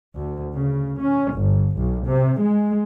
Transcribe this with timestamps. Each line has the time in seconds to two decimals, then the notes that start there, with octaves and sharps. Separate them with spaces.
0.16 D2
0.57 C#3
1.01 C#4
1.35 G1
1.77 B1
2.07 C3
2.41 G#3